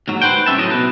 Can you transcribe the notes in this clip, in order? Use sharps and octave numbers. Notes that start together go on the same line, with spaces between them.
D#2 G#2 F#3
B4 C5 F#5 G5
C2 E3 C#4 E5 A5
A2 F#3 D#4 D#5 A5
B2 B4